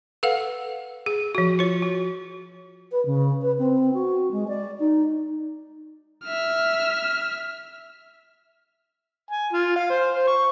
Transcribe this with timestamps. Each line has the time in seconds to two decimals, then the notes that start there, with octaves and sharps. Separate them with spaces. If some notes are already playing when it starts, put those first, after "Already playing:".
0.23 A4 B4 F5 F#5
1.06 G#4
1.35 F3 F#4
1.59 F4 C#5
1.82 F#4
2.91 B4
3.05 C#3
3.42 B4
3.58 C4
3.93 F#4
4.31 G#3
4.48 D5
4.79 D#4
6.24 E5 F6
9.31 G#5
9.53 F4
9.76 F5
9.90 C5
10.15 C5
10.28 C#6